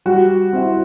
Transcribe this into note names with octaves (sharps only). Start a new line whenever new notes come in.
G3 F#4
C4 E4